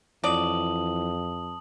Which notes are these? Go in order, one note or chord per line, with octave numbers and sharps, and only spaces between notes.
F2 E3 F#3 D5 A5 D#6 F#7